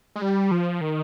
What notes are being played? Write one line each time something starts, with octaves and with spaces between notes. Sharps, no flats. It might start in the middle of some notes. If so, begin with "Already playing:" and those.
G#3
G3
F3
D#3